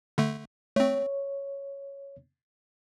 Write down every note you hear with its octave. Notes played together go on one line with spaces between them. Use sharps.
D3 A3
A3 C4 C#5